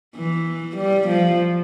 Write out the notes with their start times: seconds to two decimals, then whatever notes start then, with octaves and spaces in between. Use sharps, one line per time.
0.16 E3
0.77 G3
1.08 F3